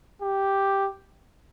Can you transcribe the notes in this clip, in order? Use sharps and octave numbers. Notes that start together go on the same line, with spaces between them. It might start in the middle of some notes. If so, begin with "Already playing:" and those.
G4